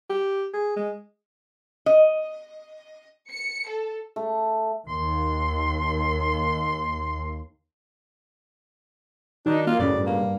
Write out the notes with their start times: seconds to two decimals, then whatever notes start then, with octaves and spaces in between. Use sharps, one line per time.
0.10 G4
0.54 G#4
0.76 G#3
1.86 D#5
3.31 C#7
3.69 A4
4.16 A3
4.88 D#2 C6
9.46 D#3 F#3 D4 D#4
9.67 A#3 F4
9.80 F#2 A2 C#3 F#3 D5
9.95 G2
10.07 A#3